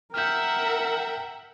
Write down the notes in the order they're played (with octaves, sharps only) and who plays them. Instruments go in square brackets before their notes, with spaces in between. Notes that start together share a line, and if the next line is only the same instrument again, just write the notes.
[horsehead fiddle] A#4 [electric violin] E5 F#5 [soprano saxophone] G5 [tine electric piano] F6 G6